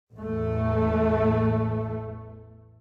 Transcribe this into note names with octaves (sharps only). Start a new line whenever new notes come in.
A1 E2 A3